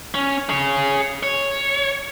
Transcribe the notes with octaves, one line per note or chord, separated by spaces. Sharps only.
C#4
G#4 C#5
C#5